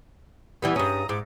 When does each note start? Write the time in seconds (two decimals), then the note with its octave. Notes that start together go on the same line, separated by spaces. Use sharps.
0.62 E3 G3 B3
0.76 G2 C#3 C#4 A#5 D#6
1.09 G#2 E4 D6